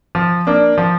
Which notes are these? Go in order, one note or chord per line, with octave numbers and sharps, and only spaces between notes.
F3
A#3 D4
F3